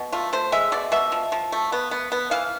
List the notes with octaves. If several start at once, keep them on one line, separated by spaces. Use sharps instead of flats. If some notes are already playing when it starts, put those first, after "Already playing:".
Already playing: B2
A3 F4
A3 C5
G#3 E5
B2 D5
B2 E5
F3
F3
A3
B3
B3
B3
E3 F5